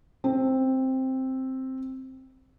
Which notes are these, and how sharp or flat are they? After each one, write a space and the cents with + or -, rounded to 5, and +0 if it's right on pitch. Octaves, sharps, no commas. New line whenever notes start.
C4 +5